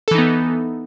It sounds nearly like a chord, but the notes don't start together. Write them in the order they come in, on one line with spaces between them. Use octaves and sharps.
A4 E3 D#4 B3